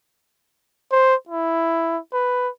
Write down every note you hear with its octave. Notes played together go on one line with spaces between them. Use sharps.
C5
E4
B4